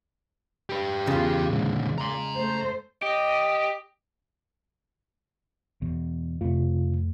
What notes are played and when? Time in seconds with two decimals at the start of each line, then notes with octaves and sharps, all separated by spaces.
0.69 G4 B4
1.07 E2 C#3 F4
1.50 A#2 D3 G#3
1.98 A#5 C6
2.36 A3 C5
3.02 G4 D#5
5.82 E2 B2
6.41 F2 C3 A3 F4